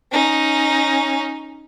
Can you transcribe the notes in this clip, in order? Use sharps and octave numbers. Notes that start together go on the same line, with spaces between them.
C#4 D#4